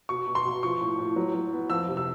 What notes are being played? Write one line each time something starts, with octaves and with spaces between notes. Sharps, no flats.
B2 C#6
B2
C6
B2
F3 C#6
A2
A2
F#3
F#3
B3
F2 E6
C3
E6